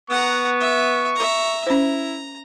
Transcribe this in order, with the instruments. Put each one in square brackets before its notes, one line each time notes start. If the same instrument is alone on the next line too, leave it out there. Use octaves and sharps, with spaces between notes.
[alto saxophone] B3 [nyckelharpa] F#5 A#5 [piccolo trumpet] C#6
[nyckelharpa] E5
E5 A#5
[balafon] C#4 C5 [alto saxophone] E4 [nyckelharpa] A#5